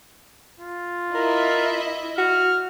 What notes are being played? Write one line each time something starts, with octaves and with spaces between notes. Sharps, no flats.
F4
E4 A#4 D#5 E5
F#4 F6